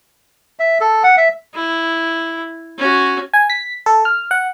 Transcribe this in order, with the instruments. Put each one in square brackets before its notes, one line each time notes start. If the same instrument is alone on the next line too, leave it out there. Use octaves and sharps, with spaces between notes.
[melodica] E5
A4
F#5
E5
[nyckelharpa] E4
C#4 F#4
[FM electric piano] G#5
B6
A4
F6
F#5